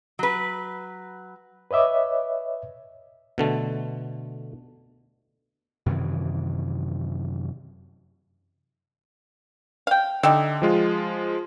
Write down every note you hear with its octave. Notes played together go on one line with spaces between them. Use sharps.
F#3 B4
B4 C#5 D#5 E5 D6
B2 D3 A3
F#2 C3 D#3 E3
F5 G5
D3 D#4 G4 E5
F3 G#3 F4